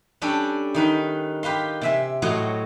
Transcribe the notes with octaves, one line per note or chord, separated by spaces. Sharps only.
G3 C#4 D4 A4
D#3 D#4 B4
G4 B4 F5 C6
C3 E5 G#5
A2 F#3 F#4 C#5 D#5 C6